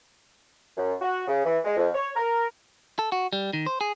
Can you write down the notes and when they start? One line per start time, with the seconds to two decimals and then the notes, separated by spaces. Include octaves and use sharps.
0.77 F#2
1.02 F#4
1.28 C#3
1.46 E3
1.64 G#3
1.77 F2
1.95 C#5
2.16 A#4
2.99 A4
3.12 F#4
3.33 G3
3.53 D#3
3.66 C5
3.81 G#4